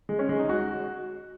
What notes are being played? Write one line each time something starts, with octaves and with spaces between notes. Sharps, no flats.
G#3
C#4
G#3
D#4
F#4